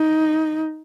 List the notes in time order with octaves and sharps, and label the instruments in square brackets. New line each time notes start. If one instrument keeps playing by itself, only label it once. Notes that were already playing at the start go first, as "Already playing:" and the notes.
Already playing: [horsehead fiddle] D#4